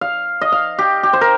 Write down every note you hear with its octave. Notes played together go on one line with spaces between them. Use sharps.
F5
D#5
F5
G4
G4
C5
A#4